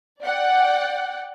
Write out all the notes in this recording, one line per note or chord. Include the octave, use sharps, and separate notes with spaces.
D5 F#5 G5